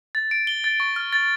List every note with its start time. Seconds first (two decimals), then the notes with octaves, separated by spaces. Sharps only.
0.15 A6
0.31 D7
0.47 G7
0.64 A6
0.80 C#6
0.96 F6
1.13 A6